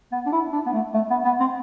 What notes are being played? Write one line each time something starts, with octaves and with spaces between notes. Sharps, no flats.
B3
D4
E4
D4
B3
A3
A3
B3
B3
C4